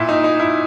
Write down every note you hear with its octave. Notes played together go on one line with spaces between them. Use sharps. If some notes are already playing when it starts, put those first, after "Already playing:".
Already playing: A#2 E4
D#4
D#4
E4